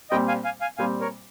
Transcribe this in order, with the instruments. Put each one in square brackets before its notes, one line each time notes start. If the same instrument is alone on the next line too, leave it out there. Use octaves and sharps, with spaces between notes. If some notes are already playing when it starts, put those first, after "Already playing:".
[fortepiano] A#2 G3 C4 [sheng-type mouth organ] D#5 G5
[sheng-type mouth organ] F5 G#5
F5 G#5
F5 G#5
[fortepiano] A#2 G3 C4 [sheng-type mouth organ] F5 G#5
[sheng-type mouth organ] A#4 C#5